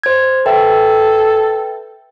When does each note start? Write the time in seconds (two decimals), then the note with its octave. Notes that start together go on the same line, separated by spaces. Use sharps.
0.03 C5 G#6
0.46 A4 B4 E5 G5